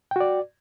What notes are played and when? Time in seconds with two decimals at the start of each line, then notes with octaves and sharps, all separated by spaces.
0.11 G5
0.16 F#4
0.20 D5